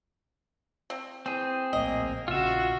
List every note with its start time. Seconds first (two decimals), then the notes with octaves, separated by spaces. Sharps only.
0.90 C4
1.26 E3 C4 G#4
1.73 D1 A#1 A2 A#3 D#5
2.28 A#1 C#3 F4 F#4 E5